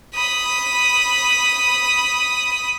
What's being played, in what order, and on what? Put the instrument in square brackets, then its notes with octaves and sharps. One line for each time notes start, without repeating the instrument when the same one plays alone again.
[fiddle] B5 D#6